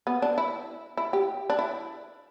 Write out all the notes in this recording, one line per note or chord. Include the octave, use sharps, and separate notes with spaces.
B3
D4
E4
E4
G4
D4
E4